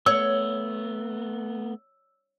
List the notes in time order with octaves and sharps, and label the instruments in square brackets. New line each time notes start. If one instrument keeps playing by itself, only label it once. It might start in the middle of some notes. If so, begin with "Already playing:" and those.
[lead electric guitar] A3 B3 [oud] C#5 [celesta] E6